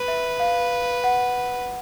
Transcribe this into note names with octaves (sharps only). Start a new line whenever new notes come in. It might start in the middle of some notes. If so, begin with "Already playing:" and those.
Already playing: B4
E5
F5
F#5